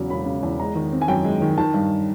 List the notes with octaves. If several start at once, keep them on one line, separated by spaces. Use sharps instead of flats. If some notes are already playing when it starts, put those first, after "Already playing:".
Already playing: E2 C#3 F#3
E1 B5
C#3
E2
G#3 A#5
D#3
C4
G#5
F#2 G5
G#3
D#3
D#3 A5
G2